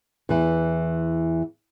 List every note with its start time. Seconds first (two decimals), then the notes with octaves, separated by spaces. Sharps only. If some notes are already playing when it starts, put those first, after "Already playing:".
0.29 E2 E3